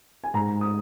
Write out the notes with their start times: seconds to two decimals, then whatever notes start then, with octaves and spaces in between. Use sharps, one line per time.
0.24 G#5
0.34 G#2 A#5
0.61 D#6